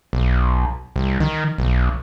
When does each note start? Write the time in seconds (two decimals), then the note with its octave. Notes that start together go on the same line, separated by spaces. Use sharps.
0.13 B1
0.96 C2
1.20 D#3
1.58 B1